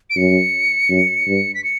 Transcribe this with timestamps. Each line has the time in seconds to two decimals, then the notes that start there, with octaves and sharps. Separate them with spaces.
0.10 D7
0.17 F#2 C#7
0.90 F#2
1.27 G2
1.55 B6
1.64 C#7